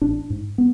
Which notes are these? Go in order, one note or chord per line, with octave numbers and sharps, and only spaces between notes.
A1 D4
G#2
B3